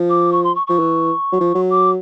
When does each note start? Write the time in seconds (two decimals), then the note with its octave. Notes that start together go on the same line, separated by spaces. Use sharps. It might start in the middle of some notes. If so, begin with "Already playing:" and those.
Already playing: F3
0.10 D6
0.32 C#6
0.44 C6
0.55 C#6
0.67 F3 C#6
0.79 E3
1.32 F#3
1.40 F3
1.55 F#3
1.70 D6